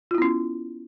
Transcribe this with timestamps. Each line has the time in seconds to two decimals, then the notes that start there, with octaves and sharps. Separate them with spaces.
0.11 F4
0.15 E4
0.18 B3
0.22 C#4